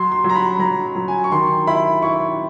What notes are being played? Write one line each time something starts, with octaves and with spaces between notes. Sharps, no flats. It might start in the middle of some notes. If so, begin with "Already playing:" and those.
Already playing: F#3 C6
C6
F#3
A#5
B5
F#3 A#5
F#3
G#5
C#6
D#3 C6
E4 B5
E4 C#6